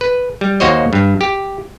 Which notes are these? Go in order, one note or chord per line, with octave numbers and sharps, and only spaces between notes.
B4
G3
D#2 A#3 F#4 C5 C#5 D#5
G2
G4